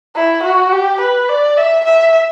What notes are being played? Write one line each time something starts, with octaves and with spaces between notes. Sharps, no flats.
E4
F#4
G4
B4
D5
E5
E5